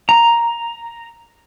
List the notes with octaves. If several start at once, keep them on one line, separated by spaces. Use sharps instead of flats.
A#5